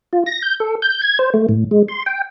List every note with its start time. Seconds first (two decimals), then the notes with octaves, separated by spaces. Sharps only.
0.13 F4
0.26 A#6
0.43 G6
0.60 A4
0.82 G6
1.02 G#6
1.19 C5
1.34 A3
1.49 A2
1.71 G#3
1.88 C6
2.06 G5